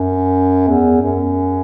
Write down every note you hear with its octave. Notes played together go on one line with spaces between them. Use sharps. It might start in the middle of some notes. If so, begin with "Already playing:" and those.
Already playing: F#2
E2
F#2